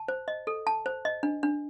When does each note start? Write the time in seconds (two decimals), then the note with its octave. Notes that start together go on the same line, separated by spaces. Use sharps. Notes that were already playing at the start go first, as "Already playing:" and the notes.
Already playing: A5
0.08 C5
0.28 D#5
0.47 A4
0.67 A5
0.86 C5
1.05 D#5
1.23 D4
1.43 D4